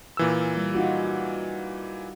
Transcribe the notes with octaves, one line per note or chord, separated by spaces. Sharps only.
A#2 E3 E6
G3
D#4 F4 F#4